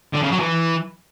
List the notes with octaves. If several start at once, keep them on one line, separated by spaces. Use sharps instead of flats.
D3
C#3
F#3
E3